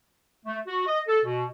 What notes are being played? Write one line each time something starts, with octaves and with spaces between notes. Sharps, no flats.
A3
F#4
D#5
A4
B2